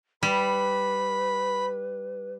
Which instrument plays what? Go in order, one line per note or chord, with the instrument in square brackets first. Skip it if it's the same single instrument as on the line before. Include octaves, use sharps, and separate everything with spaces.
[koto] G3 [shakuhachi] B4 [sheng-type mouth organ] B5